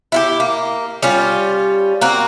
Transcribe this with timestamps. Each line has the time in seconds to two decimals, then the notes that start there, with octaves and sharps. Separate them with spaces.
0.12 E4 F4 G4
0.40 A#3
1.02 G3 C#4 F4
2.01 A#3 C4 F#4